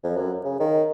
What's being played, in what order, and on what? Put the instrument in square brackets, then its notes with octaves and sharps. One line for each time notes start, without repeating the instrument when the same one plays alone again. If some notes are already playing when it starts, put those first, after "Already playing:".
[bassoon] F2
F#2
C#3
D#3